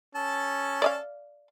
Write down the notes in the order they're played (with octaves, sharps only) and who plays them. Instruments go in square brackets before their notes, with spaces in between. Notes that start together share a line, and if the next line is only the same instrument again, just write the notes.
[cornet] C#4 [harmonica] A4 A5
[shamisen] D5 D#5 F5